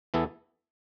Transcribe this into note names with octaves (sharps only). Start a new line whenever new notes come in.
E2 E3 B3 E4 A4